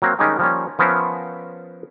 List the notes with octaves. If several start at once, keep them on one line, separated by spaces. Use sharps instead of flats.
F#3 A#3 C4
D#3 G3 G#3 C#4 D#4 G4
F3 G3 A#3 C#4
F3 B3 C#4 A#4 C5 E5